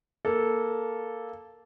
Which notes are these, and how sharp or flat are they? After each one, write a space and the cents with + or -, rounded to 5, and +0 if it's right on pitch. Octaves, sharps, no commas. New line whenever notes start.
A#3 +0 A4 -10